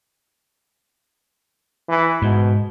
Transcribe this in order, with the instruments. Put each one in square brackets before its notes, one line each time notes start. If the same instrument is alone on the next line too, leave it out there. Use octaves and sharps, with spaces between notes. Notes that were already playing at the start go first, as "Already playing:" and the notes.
[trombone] E3
[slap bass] G#2 [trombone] B2